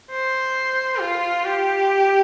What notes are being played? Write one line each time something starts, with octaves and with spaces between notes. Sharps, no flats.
C5
F4
G4